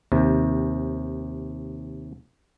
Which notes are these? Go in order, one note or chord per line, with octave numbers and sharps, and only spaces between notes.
D#2 C3